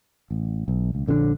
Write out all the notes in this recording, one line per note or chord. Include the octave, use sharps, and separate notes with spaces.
A1
B1
C#2
A#1 D3 D#3 D4